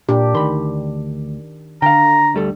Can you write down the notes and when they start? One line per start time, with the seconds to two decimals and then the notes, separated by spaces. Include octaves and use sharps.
0.09 A#2 D4 G4
0.35 D2 D#3 B5 C6
1.82 D3 F5 G5 A#5
2.34 D2 G3 A4